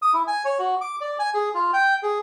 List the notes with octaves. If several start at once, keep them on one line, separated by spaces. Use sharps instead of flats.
D#6
E4
G#5
C#5
F#4
D6
D5
G#5
G#4
F4
G5
G#4